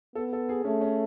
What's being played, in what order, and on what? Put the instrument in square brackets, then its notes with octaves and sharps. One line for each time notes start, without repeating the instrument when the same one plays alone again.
[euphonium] B3 [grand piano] A4
[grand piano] A4
G#4
[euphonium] A3 [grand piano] C#4
[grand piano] C#4